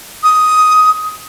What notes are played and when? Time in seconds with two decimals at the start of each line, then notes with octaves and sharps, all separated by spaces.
0.23 D#6